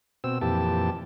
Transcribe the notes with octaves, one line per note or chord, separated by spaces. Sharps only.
B2 C4 E6
F2 A#2 E3 G4 A5